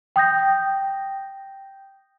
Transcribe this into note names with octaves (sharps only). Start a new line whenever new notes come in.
G5 D#6 G6 A#6